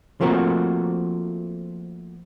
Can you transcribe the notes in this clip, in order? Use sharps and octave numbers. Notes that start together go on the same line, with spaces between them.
F3 A3 A#3 C4 F#4